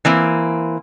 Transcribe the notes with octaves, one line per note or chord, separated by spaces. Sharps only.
E3 A#3 C4